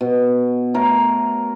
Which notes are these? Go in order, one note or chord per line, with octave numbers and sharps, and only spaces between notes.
B2
A3 A#4 C#5